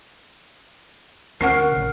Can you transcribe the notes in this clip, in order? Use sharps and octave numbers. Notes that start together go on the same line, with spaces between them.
D2 A#4 F#5 C#6 C7
A1 C#3